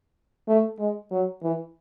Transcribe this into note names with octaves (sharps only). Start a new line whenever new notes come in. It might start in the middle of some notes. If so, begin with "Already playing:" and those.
A3
G#3
F#3
E3